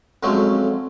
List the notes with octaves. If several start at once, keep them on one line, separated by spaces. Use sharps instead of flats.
F2 F3 F#3 G#3 A3 C#4